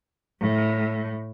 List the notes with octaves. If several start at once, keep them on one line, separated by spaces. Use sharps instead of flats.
A2